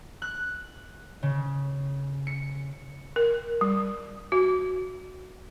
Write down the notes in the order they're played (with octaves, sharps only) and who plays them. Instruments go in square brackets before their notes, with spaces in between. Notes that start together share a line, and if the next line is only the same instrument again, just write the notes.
[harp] F#6
C#3
C#7
[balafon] A#4
G3
F#4